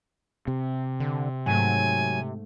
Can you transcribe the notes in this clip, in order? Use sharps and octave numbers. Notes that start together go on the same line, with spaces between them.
C3
D3
G#2 F#3 A3 G#5